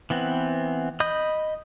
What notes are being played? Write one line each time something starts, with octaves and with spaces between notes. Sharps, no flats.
E3 B3 C4
D#5 B5 D#6 G6